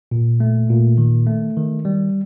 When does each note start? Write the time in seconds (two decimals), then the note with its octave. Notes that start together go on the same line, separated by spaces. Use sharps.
0.11 A#2
0.40 A3
0.70 A#2
0.98 D#3
1.27 A3
1.57 D#3
1.85 G3